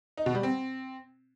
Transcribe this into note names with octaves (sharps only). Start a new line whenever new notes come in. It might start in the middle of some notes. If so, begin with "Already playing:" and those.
D#4
B2
G3
C4